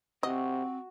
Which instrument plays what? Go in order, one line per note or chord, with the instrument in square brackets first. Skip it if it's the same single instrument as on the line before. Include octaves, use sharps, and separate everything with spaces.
[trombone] C3 [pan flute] C4 [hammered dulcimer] F#4 [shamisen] D#5